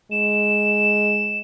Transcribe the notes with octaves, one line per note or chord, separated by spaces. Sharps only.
G#3 E7